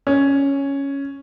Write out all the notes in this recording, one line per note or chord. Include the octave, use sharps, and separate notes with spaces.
C#4